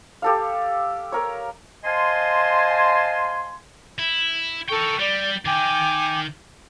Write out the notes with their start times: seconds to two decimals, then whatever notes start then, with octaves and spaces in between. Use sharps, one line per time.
0.22 G4 A4 F5
1.12 A#4 C#5
1.84 C5 D#5 F5 G#5 A5 C6
3.99 E4
4.69 A4 A#4 G5 C#6
5.00 G3 D5
5.45 D#3 G5 G#5 D6